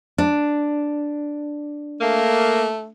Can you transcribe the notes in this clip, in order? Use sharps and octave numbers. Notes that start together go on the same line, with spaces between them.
D4
A3 A#3